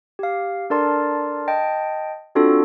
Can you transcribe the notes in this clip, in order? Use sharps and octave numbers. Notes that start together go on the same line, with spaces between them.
G4 F5
D4 A4 A#4 D5 A5 C6
D#5 G5 A5
C4 D4 F4 F#4 A4